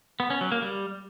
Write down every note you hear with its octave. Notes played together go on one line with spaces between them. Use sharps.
B3
C#4
F#3
A#3
G3